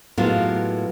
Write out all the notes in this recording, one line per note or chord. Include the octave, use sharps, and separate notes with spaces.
A2 F#3 G#3 A#3 B3 F4